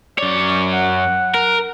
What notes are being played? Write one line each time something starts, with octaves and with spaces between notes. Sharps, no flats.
F#2 C#5 D5
F#5
A#4